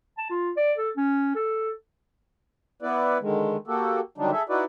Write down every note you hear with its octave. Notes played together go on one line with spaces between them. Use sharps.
A5
F4
D5
A4
C#4
A4
B3 E4 B4 D5
D3 D#3 G#3
A#3 F#4 G4 A4
D3 D#3 F#3 G3 D4 D#4
G#4 A4 E5
D#4 E4 F#4 B4 D5